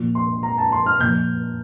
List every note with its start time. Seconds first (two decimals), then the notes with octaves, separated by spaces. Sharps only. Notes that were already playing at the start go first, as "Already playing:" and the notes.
Already playing: A#2 F3
0.15 C6
0.43 A#5
0.58 A5
0.72 C6
0.86 F6
1.00 A#2 F3 G6